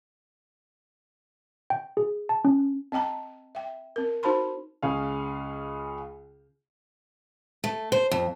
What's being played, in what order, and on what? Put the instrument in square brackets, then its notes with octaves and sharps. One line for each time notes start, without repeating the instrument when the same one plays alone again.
[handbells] G5
G#4
A5
C#4
[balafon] C4 D#5 G5 A5 A#5
E5 G5
C4 A#4
D#4 F#4 C5 A5 B5 C6
[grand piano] C#2 C#4 G#4 F5
[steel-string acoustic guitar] A3
C5
F2